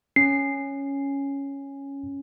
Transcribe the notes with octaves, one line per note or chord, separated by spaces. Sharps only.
C#4 C7